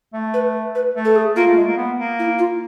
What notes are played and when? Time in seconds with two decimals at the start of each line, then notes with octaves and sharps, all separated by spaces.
0.14 A3
0.34 B4
0.75 B4
0.95 A3
1.05 A4
1.16 G#4
1.36 A#3 F4
1.47 A3
1.57 G#3
1.67 A#3
1.77 B3
1.98 A#3
2.19 E4
2.39 F4